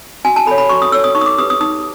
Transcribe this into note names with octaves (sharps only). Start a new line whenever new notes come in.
F#4 G#5
A5
A4 C#5 B5
B5
F#4 C#6
D#6
A4 C#5 E6
D#6
D#4 C#6
D#6
D6
G4 B4 D#6
D#6
D#4 D#6